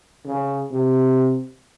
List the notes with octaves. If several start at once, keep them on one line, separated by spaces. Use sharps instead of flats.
C#3
C3